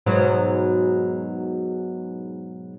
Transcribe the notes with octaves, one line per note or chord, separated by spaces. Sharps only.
G#2 B2 F#3